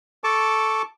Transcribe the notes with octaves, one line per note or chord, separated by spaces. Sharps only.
A4 A5 C#6 D6